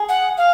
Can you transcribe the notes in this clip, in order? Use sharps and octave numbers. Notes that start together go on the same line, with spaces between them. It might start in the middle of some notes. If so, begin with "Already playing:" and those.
Already playing: G#4
F#5
F5